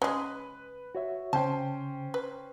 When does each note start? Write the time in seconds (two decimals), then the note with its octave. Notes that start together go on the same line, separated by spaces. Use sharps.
0.02 C#3 G#3 B4
0.95 F#4 C#5 E5
1.33 C#3 C#4 C5 G5 A5
2.14 B4